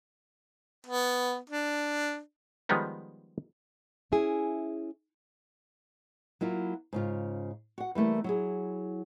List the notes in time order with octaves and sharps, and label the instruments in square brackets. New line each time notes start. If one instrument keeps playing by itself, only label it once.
[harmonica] B3
D4
[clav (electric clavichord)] D#3 F3 G3 G#3 B3 D#4
[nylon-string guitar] C#4 E4 G#4
F#3 A#3 E4 F4
G#2 C#3 F4
F#4 F#5
E3 G3 A3 A#3
F#3 E4 G#4